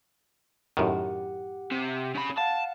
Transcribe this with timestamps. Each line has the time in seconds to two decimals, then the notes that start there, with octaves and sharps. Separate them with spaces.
0.77 F#2 A2 D#3 G4 F#5
1.71 C3
2.15 C#3 B5
2.38 F5 F#5 A5